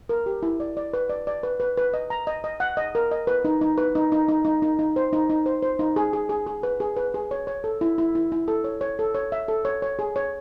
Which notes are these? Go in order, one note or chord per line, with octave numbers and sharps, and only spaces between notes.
A#4
G4
E4
D5
D5
B4
D5
D5
B4
B4
B4
D#5
A#5
D#5
D#5
F#5
D#5
A#4
D#5
B4
D#4
D#4
B4
D#4
D#4
D#4
D#4
D#4
D#4
C5
D#4
D#4
C5
C5
D#4
G#4
G#4
G#4
G#4
B4
G#4
B4
G#4
C#5
C#5
A4
E4
E4
E4
E4
A4
C#5
C#5
A4
C#5
E5
A4
C#5
C#5
G#4
C#5